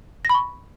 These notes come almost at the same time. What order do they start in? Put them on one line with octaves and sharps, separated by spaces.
A#6 B5 C#6